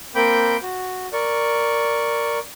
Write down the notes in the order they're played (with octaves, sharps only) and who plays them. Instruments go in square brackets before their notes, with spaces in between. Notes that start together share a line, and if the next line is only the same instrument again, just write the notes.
[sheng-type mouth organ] A#3 C4 G5 B5 D6 G6
F#4
A#4 D5 C#6